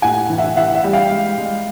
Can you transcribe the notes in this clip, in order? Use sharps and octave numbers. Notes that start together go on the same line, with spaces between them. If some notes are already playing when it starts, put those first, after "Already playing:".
A2 F#5 G#5
E3
E5 F#5
E3 E5 F#5
E5 F#5
G3
F5 G5
G#3
G#3